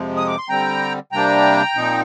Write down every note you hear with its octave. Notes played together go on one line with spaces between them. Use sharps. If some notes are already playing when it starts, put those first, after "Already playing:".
Already playing: F2 C3 F3 G#3
D#6
D6
C6
D3 G3 C4 G5 A#5
C3 G3 A#3 D4 G5 A#5
A#2 F3 C4 D#4